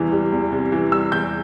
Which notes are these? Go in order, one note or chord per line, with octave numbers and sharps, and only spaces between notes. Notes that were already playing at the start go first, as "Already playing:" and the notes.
Already playing: E2 C3 E3 G3
G3
E2
C3
E3
G3 E6
E2 G6